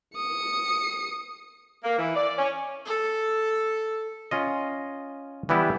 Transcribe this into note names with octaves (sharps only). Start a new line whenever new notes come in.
D#6 C#7
A#3
E3
D5
C#4
A4
C#4 F4 D#5
E3 G3 B3 E4 G4